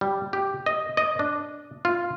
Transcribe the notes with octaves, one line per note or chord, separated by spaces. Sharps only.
G3
G4
D#5
D#5
D4
F4